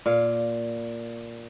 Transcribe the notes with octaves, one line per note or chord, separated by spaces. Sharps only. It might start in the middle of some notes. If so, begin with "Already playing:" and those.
A#2 F5